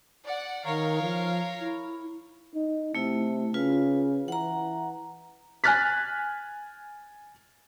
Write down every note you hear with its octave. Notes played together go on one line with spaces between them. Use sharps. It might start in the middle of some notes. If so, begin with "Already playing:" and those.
D5 F#5
D#3 A#4 C#5 F5
F3
E4
D#4
C3 A3 E4
C#3 F4 B4
E3 F#5 A#5
G#5 F6 F#6 A6 B6